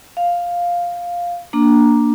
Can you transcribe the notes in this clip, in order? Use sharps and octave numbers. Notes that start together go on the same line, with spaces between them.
F5
A#3 D4 A#5